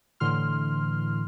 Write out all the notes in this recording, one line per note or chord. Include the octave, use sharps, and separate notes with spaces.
A2 D3 E3 C6 F6